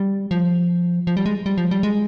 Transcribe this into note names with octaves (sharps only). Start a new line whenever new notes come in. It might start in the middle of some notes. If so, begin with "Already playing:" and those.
Already playing: G3
F3
F3
G3
G#3
G3
F3
G3
G#3